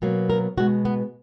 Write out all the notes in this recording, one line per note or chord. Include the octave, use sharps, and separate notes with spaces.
B2 F#3 A#3
A#4
B2 G#3 F#4
B3